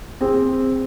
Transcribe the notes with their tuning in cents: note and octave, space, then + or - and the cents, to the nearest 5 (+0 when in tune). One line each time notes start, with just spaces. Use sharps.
C4 +0 G#4 -30